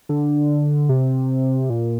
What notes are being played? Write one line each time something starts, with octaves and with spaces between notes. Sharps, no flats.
D3
C3
A#2